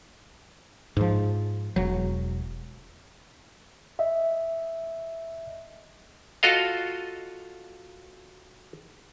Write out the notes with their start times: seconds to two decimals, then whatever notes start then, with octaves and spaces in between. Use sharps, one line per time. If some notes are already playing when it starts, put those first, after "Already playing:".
0.97 G#2 F3
1.76 E1 F#3
3.99 D#5 E5
6.43 F4 F#4 A4 D#5 F5